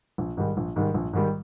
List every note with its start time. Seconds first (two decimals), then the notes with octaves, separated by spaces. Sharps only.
0.18 A#1
0.37 G#2 D#3 G3
0.57 A#1
0.76 G#2 D#3 G3
0.94 A#1
1.13 G#2 D#3 G3